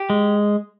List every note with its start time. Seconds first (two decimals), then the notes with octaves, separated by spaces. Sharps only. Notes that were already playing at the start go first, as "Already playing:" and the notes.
Already playing: G4
0.10 G#3